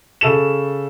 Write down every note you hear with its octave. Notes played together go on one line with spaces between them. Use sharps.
C#3 A4 E7